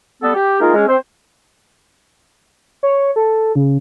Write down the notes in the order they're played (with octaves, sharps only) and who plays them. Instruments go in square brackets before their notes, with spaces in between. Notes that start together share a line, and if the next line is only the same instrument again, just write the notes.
[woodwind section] G3 B3 A4
G4
G#3 A#3 D#4 F4 G#4 A#4
G#3 C#4
C4 C5
[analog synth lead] C#5
A4
C#3